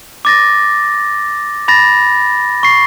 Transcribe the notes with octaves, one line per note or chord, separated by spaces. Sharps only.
D6 A6 A#6
B5 A6 A#6
C#6 C7